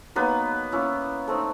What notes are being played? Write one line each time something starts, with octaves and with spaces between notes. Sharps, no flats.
F#3 A#3 B3 D#4 B4
A#3 C#4 E4
A3 C4 D#4